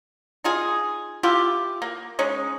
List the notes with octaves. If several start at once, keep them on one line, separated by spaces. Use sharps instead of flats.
D#4 F4 G#4
E4 F4 G4
A#3
G#3 C#4 D#4